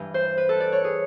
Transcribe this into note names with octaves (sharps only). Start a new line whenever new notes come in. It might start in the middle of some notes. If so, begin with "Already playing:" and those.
Already playing: G2 E3
C5
B4
A4
D5
C#5
G#4